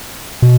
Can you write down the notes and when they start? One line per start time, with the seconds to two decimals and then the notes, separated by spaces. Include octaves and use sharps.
0.42 B2